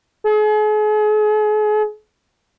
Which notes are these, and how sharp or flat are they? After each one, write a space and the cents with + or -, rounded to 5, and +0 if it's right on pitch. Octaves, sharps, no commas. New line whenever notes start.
G#4 +40